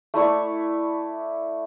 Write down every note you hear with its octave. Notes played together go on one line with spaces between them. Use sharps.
A3 E4 D5 C#6